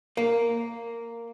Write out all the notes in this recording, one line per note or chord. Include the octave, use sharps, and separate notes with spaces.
A#3